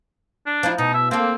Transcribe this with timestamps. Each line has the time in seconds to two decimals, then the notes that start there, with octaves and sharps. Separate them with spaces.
0.46 D4
0.63 F3 D#4 E4
0.78 B2 D#4
0.94 E5
1.11 A#3 C4 A4